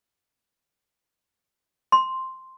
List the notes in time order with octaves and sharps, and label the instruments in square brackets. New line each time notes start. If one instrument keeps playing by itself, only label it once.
[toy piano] C6